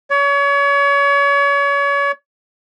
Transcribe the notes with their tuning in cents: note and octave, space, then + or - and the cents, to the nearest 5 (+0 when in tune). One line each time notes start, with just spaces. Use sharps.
C#5 +35